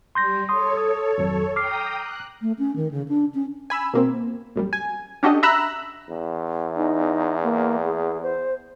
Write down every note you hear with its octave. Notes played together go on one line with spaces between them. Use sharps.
G3 C6 G6 A#6
A4 C#5 C6 D#6
D#6
G#1 F2 F#3
G5 A#5 D6 D#6 F6 C7
F#6
A3
C#4
D#3
C#3
D4
C#4
G#5 B5 E6
B2 A#3 C4
A#1 F#2 G3
G#5
C#4 D4 F#4 G4 A4 D#5
E5 A#5 B5 E6 F#6
E2
D#4
A#3
G#4
C5